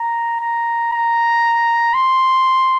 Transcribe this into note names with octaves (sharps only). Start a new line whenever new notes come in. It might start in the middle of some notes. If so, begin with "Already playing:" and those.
Already playing: A#5
A#5
A#5
C6